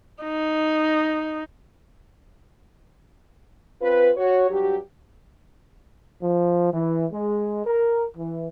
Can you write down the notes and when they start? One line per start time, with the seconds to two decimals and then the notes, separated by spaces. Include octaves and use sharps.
0.23 D#4
3.81 C4 F4 B4
4.16 F#4 C#5
4.50 G2 F#3 F#4 G4
6.21 F3
6.73 E3
7.12 G#3
7.66 A#4
8.17 E3